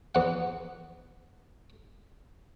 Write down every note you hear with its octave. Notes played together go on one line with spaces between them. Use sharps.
E2 F#5